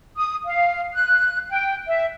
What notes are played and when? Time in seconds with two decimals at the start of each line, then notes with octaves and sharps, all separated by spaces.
0.17 D#6
0.45 F5
0.94 F#6
1.50 G5
1.88 E5